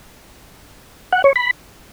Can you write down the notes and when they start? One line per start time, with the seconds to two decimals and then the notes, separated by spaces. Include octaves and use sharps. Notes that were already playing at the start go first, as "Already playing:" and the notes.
1.12 F#5
1.24 C#5
1.36 B5